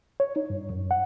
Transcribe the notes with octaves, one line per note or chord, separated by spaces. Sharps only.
C#5
D#4
G2
F#2
F#5